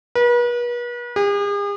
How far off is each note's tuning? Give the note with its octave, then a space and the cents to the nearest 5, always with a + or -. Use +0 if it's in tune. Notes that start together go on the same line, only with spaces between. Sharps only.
B4 -40
G#4 -45